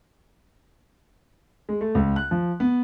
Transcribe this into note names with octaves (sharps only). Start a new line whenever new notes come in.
G#3
A3
C#2
F#6
F3
B3